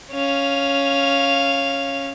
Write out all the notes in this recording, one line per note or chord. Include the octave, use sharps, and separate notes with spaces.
C#4 F5